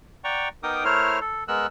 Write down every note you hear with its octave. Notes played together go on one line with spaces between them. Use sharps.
D5 F#5 G5 A#5 C#6
B3 D#4 A#4 G5 D6 D#6
A3 E4 A#4 C5 C#5 F6
A4
G#3 B3 A#4 E6 F#6